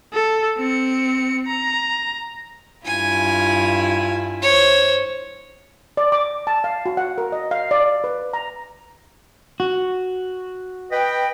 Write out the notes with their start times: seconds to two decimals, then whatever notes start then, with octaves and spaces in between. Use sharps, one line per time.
0.13 A4
0.58 C4 C#7
1.47 A#5
2.86 G2 E4 F4 G#5
4.42 C5 C#5
5.97 D5
6.12 D6
6.47 A5
6.64 F5
6.86 F#4
6.97 F#5
7.18 A#4
7.32 D#5
7.51 F5
7.71 D5
8.04 B4
8.33 A#5
9.60 F#4
10.92 B4 D#5 G5